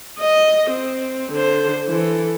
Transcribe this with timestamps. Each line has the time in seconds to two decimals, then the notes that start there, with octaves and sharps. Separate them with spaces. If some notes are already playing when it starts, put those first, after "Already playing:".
0.19 D#5
0.70 C4
1.32 D3 C5
1.87 E3 A4